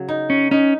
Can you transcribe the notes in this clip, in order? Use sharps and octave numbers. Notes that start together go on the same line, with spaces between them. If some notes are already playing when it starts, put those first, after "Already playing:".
Already playing: C#3 F#3
D#4
C#4
C#4 D#4